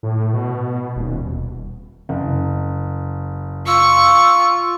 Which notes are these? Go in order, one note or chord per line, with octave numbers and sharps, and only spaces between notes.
A2
B2
D#1
F#1
F4 C#6 E6